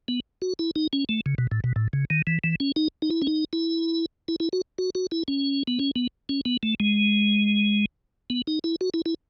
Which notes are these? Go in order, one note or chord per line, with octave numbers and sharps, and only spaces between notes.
B3
F#4
E4
D#4
C#4
A3
C#3
B2
A2
B2
A2
C#3
D#3
E3
E3
C#4
D#4
D#4
E4
C#4
D#4
E4
E4
E4
F#4
F#4
F#4
E4
C#4
B3
C#4
B3
C#4
B3
A3
G#3
B3
D#4
E4
F#4
E4
E4